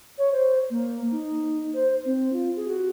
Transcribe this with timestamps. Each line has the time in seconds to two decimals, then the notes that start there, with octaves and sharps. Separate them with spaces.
0.18 C#5
0.32 C5
0.70 A#3
1.11 D#4
1.74 C5
2.05 C4
2.33 F4
2.56 G#4
2.67 F#4